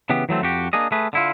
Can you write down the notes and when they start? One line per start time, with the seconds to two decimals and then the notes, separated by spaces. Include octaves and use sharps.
0.10 C#3 E3 B3 G4
0.29 E3 F#3 A3 C4
0.42 F2 F#4 G4
0.73 A#3 D4 G#4 D#5
0.92 A3 G#4 B4
1.13 D3 E4 F4